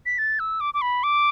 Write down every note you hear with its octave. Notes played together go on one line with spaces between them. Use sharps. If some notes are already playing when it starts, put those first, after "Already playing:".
B6
A6
E6
D6
D6
B5
D6